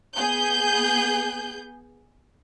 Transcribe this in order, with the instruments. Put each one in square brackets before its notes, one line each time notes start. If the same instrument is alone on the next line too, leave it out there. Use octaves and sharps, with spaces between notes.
[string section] B3 G#4 G6